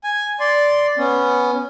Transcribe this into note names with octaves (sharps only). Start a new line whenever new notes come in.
G#5
D5 C6
B3 C#4